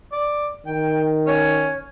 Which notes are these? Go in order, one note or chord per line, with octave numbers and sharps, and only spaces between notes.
D5
D#3 G5
C#4 C#5